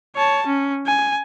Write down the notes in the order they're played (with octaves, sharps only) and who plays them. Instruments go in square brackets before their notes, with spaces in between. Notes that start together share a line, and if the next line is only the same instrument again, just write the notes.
[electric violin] C#5 A5
C#4
G#5